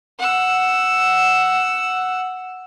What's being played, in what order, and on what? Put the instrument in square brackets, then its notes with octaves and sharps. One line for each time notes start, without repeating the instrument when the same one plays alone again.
[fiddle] F#5 E6